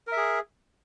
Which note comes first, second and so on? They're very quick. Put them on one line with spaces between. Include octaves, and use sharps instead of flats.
A#4 E5 G#4